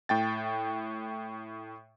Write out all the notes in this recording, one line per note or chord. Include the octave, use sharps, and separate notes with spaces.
A2 G5 A6